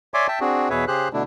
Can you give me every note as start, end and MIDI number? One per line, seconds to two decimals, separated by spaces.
0.14 0.27 73
0.14 0.27 74
0.14 0.27 76
0.14 0.27 80
0.14 0.27 84
0.14 0.27 86
0.28 0.39 76
0.28 0.39 79
0.28 0.39 81
0.40 0.69 60
0.40 0.69 62
0.40 0.69 66
0.40 0.69 68
0.70 0.85 40
0.70 0.85 47
0.70 0.85 68
0.70 0.85 71
0.70 0.85 73
0.70 0.85 76
0.88 1.08 49
0.88 1.08 67
0.88 1.08 68
0.88 1.08 72
0.88 1.08 90
1.13 1.23 47
1.13 1.23 50
1.13 1.23 57
1.13 1.23 62
1.13 1.23 64